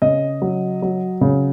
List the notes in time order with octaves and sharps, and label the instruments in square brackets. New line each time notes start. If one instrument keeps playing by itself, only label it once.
[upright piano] C#3 D#5
F#3
F#3
C#3